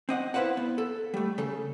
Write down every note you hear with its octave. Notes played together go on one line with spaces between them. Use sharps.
C4 D#5 F#5
E4 B4 C5 F5 F#5
B3
A4
G3 A3
C#3 A4